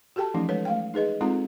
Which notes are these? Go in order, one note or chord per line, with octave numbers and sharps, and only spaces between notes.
F#4 G4 A4 G5 A5
E3 F3 A3 C#4 D#4
G#3 A4 B4 C#5
A3 F5 G5
D#4 G#4 B4 D#5
G#3 C4 D#4 F4 A4 A#5